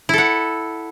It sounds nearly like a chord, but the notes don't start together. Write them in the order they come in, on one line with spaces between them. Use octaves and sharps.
E4 A4 F#5